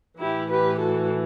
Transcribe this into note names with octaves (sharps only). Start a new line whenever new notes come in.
A2 E3 E4 G4
G4 B4
F#4 A4